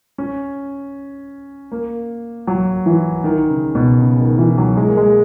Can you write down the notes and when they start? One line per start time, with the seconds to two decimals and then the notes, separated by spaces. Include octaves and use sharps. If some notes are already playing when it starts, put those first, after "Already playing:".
0.18 C#4
1.72 A#3
2.47 F#3
2.86 E3
3.24 D#3
3.50 C#3
3.75 B2
4.01 C#3
4.20 D#3
4.38 E3
4.58 F#3
4.77 G#3
4.87 A#3
4.97 G#3